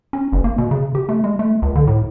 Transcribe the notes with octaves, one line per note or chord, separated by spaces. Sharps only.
C#4
F#1
A#3
B2
C#3
G4
A3
G#3
A3
C#2
D3
A2